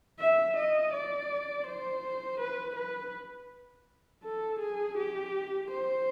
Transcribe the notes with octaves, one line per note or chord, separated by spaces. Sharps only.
E5
D#5
D5
C5
B4
B4
A4
G#4
G4
C5